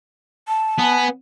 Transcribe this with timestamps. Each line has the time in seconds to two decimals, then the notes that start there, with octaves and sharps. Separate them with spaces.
0.48 A5
0.79 B3 G#5